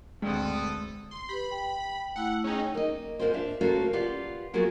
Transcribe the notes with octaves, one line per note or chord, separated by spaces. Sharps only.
D2 G2 D3 G#3 B3 C4 A4 D#6
C6
G4 B4 B5
G5
A3 E4 F#5 E6
C#4 D#4 G#4 G5
A#3 D#5
G#2 B2 A#3 C4 F4 C5
D4 E5 F5
C#3 A#3 C4 F4 F#4 A4
F4 G4 B4 D5 F5 F#5
F#3 A#3 B3 F4 F#4 G#4